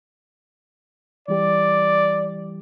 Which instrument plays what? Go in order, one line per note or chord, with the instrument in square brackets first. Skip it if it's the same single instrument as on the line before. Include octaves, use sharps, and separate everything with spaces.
[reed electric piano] E3 G3 G4 [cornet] D5